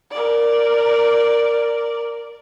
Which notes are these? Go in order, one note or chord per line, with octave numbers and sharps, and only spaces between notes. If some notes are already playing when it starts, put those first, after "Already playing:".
A#4 D5